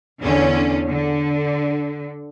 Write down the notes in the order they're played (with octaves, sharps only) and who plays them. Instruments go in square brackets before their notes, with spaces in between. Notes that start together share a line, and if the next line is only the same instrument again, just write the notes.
[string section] E2 D3 C#4
D3